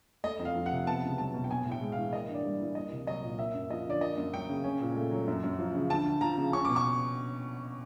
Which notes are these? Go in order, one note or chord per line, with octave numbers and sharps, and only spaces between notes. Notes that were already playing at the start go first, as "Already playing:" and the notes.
A3 D#5
F2
F5
F3
F#5
C3
B3 A5
C#2
F#3 A5
B2
G5
B3 G#5
A2
G5
G#3
F5
E3
A#3 D#5
G2
D5
G3
E3
A#3 D#5
C2
F#3 D#5
A#2
A#3 E5
F#2
F3 D#5
D3 D5
A#3 D#5
F#2
F#3 G5
C#3
C#4
A#2
A3
F#3
F#2
F#2
F3
C#3
D2 A5
D2
F3 A#5
C#3
C#4 C#6
B2 D6
C#6